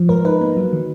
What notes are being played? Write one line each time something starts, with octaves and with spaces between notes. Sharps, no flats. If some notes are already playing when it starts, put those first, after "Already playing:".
Already playing: F3
G#2 A#4
D#4 B4
A#3
F#3
D#3